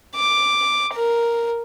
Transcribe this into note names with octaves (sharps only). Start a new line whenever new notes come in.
D6
A#4